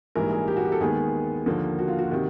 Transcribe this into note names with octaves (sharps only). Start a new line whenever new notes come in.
A#1 G#2 E3 G3 A#4
G#4
G4
F#4
G4
A4
D#2 D#3 G#3 B3 G#4
D#2 D3 F3 A#3
F#4
F4
F#4
C3 D#3